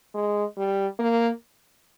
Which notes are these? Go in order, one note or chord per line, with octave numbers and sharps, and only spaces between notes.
G#3
G3
A#3